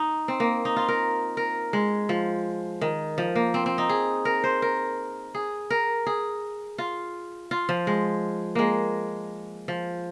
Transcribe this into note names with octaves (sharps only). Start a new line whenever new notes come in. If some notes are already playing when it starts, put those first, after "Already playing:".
Already playing: D#4
C4
A#3
D#4
F4
A#4
A#4
G#3
F3
D#3
F3
A#3
C4
C4
D#4
G#4
A#4
C5
A#4
G#4
A#4
G#4
F4
F4
F3
G#3
G#3 A#3
F3